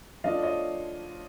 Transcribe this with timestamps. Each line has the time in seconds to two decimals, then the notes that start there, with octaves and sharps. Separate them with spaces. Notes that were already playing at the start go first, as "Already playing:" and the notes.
0.24 F3 A3 D4 F4 D#5 F5
0.43 C#5 D#5